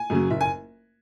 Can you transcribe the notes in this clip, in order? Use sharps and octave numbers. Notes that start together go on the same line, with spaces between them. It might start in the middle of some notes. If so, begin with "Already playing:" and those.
Already playing: G#5
F#2 C#3 F#3
F#1 E5
G#5